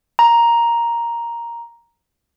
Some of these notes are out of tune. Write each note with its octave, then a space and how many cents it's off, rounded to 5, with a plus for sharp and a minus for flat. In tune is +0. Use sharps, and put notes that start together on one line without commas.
A#5 +5